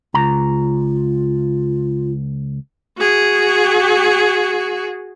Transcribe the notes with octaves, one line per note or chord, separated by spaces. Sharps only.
C#2 F4 A#5
F#4 G#4